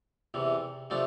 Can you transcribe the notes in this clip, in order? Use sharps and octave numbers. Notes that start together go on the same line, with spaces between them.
E2 C3 E3
C3 F3 A3 D4